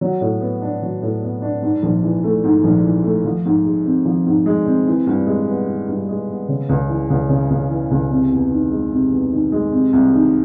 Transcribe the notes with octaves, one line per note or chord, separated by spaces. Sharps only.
F#3
A2
B3
D4
F#3
A2
B3
D4
G#2
A#1
E3
A3
G#2
A#1
E3
A3
F3
G#2
G#3
C4
F3
G#2
G#3
C4
E3
G2
G#3
B3
E3
G2
G#3
B3
C#3
C#2
E3
C#2
C#3
C#2
E3
C#2
C3
E2
D#3
G#3
C3
E2
D#3
G#3
C3
C2
D#3